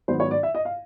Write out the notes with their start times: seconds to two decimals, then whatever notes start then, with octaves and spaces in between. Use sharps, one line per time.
0.08 G#2 D#3 F#3 B3 C5
0.20 C#5
0.31 D5
0.43 E5
0.55 D#5
0.65 F5